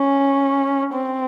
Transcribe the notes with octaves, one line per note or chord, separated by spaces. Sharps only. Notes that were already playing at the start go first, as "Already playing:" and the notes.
Already playing: C#4
C4